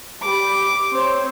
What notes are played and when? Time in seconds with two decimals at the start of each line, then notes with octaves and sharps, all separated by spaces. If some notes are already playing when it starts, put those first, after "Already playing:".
0.21 G3 G4 B5 D6
0.91 C4 C5 C#5